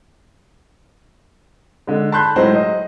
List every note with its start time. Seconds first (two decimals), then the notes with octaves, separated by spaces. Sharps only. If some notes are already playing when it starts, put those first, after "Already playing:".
1.87 D3 G#3
2.12 A5 B5 C6 F#6 G6
2.36 A2 F#3 G#3 C5
2.55 C5 D#5